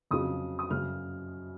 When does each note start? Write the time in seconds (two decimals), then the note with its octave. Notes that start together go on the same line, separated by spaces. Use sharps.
0.11 F2 C#3 F#3 D#6
0.59 D#6
0.71 F#2 C#3 F#3 F6